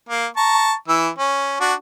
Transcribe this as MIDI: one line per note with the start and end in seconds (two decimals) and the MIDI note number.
0.09 0.26 58
0.37 0.73 81
0.37 0.73 82
0.37 0.73 85
0.88 1.09 52
0.88 1.09 88
1.18 1.60 61
1.60 1.74 62
1.60 1.74 66